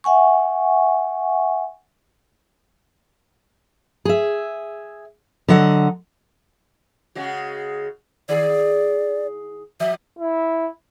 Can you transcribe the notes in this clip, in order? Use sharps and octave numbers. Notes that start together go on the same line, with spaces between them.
E5 F#5 G#5 C#6
G#4 E5
D3 F#3 D#5 F#5
C#3 G#3 F#4
D#3 G#4 D5
F3 E5
E4